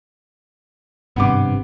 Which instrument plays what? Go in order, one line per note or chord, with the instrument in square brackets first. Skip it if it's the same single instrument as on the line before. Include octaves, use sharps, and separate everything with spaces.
[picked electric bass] G#1 G2 C3 [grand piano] B3 D6